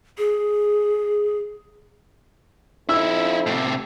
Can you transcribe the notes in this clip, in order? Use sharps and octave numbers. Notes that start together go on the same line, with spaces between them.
G#4
F2 D#4 E4 E6
A2 C3